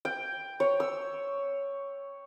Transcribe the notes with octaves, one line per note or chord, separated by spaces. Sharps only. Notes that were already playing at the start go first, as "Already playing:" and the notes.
G5
C#5
E6